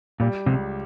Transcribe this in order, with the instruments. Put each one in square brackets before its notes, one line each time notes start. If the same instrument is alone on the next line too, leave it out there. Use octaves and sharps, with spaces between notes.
[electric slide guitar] A#2 [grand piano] G3
[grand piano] C#2 [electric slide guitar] C3